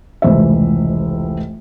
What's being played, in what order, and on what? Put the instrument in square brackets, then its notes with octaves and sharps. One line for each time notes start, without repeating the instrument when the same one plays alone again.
[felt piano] F1 C#2 E3 C5 E5